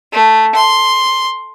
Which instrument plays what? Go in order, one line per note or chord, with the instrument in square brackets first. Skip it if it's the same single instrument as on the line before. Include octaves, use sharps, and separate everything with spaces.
[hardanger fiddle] A3
C6